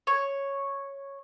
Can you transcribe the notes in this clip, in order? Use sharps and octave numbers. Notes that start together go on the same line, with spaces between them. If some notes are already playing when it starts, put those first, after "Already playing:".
C#5